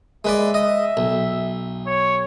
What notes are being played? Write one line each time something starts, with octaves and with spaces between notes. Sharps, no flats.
G#3 B4 D5 E5
D#5
B1
C#5